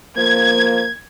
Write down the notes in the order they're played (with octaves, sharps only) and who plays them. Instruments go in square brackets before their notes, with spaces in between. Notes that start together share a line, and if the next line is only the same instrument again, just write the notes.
[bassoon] F3 [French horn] A#3 [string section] G#6